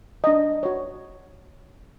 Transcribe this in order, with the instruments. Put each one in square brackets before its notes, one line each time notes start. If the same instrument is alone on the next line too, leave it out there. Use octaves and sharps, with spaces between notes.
[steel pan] D4 D#5
F#4 C#5